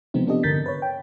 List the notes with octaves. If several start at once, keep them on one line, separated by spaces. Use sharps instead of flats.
C3 F3 G#3 B3 C4 D#4
F3 B3 D4 G4 A4 D#5
G2 D3 A#4 G6 A6 B6
B4 C#5
G5